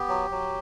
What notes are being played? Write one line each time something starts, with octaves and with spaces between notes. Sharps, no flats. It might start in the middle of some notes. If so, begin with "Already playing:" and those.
Already playing: B3 G4
F#3
F#3